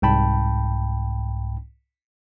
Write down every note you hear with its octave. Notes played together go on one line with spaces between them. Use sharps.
C2 G#2 G5 A5 B5